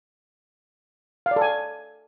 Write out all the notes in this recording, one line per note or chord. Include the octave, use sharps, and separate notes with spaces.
F5
D5
A4
G#5